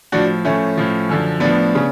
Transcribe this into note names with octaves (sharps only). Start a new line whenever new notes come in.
A2 F3 D4 F#4
A2 F3 A3 C#4
A2 F3
F#2 D3 F3
A2 F3 B3 D4
C#3